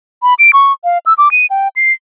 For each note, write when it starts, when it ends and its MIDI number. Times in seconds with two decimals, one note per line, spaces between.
0.23 0.34 83
0.39 0.51 98
0.53 0.72 85
0.84 0.98 77
1.06 1.13 88
1.18 1.31 86
1.31 1.46 99
1.50 1.68 79
1.76 1.93 96